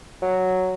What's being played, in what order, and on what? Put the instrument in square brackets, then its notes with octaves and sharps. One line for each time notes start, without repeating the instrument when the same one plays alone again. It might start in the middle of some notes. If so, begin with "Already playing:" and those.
[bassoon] F#3